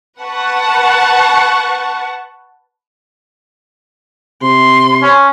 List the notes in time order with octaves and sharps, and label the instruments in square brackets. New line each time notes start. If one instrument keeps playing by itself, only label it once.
[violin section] B4 F#5 A5 C#6
[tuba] C3 [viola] C6
[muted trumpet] C#4